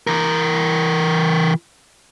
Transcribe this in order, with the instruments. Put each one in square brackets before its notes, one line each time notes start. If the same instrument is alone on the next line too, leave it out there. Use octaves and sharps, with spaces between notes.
[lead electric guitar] E3 A#4